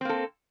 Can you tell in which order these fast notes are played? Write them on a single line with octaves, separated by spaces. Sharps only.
C4 A#3 A4